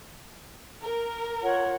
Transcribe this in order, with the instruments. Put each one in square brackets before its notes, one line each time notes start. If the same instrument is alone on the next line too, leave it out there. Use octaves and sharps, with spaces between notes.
[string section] A#4
[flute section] F4 C#5 F#5